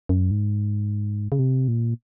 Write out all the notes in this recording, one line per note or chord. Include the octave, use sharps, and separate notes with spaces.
F#2
G#2
C#3
C3
A#2